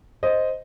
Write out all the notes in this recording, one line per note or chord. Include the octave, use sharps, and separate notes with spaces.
C5 D#5